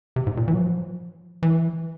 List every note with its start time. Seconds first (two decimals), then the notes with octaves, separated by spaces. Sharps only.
0.16 C3
0.27 G#2
0.37 A#2
0.48 E3
0.54 F#3
0.58 F3
1.43 E3